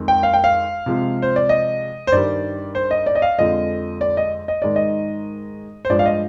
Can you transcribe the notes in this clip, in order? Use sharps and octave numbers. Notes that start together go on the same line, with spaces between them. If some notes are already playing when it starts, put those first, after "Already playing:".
Already playing: F2 D#3 G#3
G5
F5
G5
F5
C3 F3 G#3
C5
D5
D#5
C5
G2 D#3 G3 D5
C5
D#5
D5
D#5
F5
F2 D3 F3 G#3 D#5
D5
D#5
D#5
G#2 D#3 G#3 D5
D#5
C5
G2 F3 G#3 D5
F5
D#5